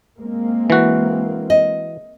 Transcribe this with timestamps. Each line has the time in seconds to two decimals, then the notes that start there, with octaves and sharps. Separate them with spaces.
0.19 G#3 A#3 C4
0.70 E3 F#4
1.50 D#5